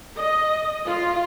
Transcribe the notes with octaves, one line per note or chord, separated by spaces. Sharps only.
D#5
F4